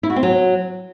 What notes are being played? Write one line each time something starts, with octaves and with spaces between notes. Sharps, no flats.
E4
F#4
C4
F#3